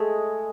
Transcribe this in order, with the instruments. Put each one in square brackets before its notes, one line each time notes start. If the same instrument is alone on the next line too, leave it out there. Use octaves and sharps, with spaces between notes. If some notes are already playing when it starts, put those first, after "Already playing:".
Already playing: [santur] G#3 [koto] A3